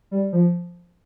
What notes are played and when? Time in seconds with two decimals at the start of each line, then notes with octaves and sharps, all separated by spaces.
0.11 G3
0.33 F3